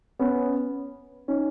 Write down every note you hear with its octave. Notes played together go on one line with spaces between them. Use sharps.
B3 C#4
C#4 D#4